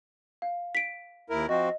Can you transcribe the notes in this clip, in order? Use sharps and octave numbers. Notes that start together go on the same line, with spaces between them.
F5
B6 D7
D#2 E4 A#4
F3 C4 F#4 D#5